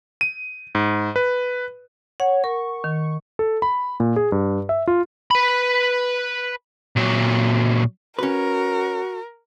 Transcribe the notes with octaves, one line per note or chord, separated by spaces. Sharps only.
D#7
G#2
B4
C#5 F#5
A#4 C#6
D#3
A4
B5
A#2
G#4
G2
E5
F4
B4 B5
A#2 F#3
C#4 F#4 A#4 B4